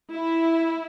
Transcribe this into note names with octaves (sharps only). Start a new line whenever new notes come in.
E4